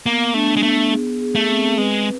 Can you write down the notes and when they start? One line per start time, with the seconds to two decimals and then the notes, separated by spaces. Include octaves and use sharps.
0.06 A#3 B3
0.34 A3 D4
0.56 G#3
0.63 A3 B3
0.92 G#4
1.21 G#4
1.35 A3
1.49 C4
1.78 G#3 B4